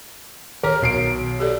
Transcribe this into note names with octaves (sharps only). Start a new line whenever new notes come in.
D#3 A#4 C#5
B1 C7 D7
G4 A4 D5